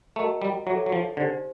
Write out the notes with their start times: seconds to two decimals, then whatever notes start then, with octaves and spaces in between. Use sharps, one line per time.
0.16 A3 F#4 A#4 D#5 F#5 A#5
0.42 G3
0.66 F#3 E5
0.69 A4 C#5
0.86 F#3
0.92 F3
1.17 D3 D#4 G4 C5